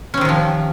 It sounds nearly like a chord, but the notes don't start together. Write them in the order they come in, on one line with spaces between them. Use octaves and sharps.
C#4 C4 D#3 C3 F3